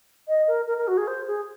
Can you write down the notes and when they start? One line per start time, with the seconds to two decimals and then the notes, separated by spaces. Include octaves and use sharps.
0.28 D#5
0.48 A#4
0.67 A#4
0.77 A#4
0.88 F#4
0.97 G#4
1.07 C5
1.27 G#4